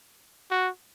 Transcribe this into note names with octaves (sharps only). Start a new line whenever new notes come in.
F#4